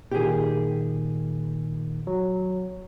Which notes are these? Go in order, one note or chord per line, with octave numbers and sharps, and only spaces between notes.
A#2 D#3 G4 G#4
F#3